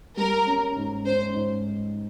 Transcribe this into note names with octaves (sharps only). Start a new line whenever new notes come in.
G3 A#4
C#4
G#2
C#4 C5
G#2